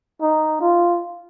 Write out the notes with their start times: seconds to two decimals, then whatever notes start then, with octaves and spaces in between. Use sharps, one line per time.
0.22 D#4
0.61 F4